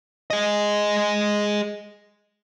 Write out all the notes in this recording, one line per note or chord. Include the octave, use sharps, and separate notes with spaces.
G#4 D#5